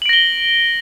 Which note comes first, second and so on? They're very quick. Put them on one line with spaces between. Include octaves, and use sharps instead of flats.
F#7 D7 A#6 G7